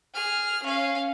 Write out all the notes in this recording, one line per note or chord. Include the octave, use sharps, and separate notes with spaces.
G#4 F6
C#4 F5